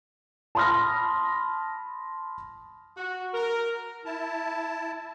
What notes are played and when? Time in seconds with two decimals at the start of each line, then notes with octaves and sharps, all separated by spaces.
0.55 A5 B5 C6 D#6 F6 A#6
2.97 F#4
3.33 A#4
4.05 E4 A5